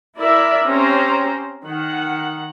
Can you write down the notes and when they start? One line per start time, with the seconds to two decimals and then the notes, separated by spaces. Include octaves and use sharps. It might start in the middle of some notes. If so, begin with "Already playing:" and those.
0.19 E4 A#4 D5 E5
0.66 C4 C#4 G4 C5 A#5
1.65 D#3 F#5